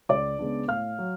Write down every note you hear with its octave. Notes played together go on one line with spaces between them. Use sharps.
C#2 D5 D6
C#3 G#3 B3 D4
A2 F5 F6
F#3